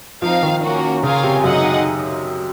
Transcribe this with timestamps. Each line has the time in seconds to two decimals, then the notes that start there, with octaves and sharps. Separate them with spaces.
0.22 F3 C4 D#4 A#4 F5
0.43 D#3
0.62 A#3 C#4 F#4 A#4
1.03 C#3 F4 A#4 C#5 F5 G#5
1.23 C3
1.44 F#2 D#4 G#4 D#5 F#5